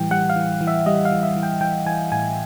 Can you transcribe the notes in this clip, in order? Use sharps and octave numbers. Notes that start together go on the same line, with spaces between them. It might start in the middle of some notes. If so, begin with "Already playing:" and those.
Already playing: A2 E3 G3 G5
G3 F#5
F5
E3
E3
E5
G3 D#5
F5
E3
E5
E3
G5
E3 G5
E3 G#5
A2 G#5